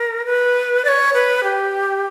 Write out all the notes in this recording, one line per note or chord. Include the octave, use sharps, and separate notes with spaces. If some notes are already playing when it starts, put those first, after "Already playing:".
Already playing: A#4
B4
D5
C#5
B4
G4